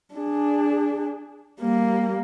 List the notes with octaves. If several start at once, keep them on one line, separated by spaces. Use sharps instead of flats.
D4 G#4
G3 A#3